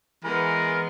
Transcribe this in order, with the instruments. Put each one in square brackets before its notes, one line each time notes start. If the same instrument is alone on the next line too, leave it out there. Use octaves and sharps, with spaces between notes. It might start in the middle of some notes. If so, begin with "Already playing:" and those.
[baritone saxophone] E3 [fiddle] G#3 B3 [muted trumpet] A#4